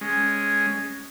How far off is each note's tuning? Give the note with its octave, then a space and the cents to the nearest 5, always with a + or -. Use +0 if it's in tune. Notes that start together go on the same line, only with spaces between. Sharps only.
G#3 +0 C#4 +0